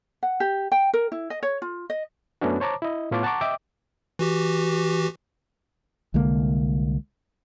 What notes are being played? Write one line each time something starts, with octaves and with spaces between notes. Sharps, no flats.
F#5
G4
G5
A#4
E4
D#5
C#5
F4
D#5
F#2 A3 B3 C#4 D4 F#4
C5 C#5 A5 A#5 D6
E4 D#5
A2 B3 F4 C#5 A5 D6
F#5 A5 A#5 C#6 D6
D#5 E5 G5 D6
E3 F#4 G4
C2 D3 G#3 A#3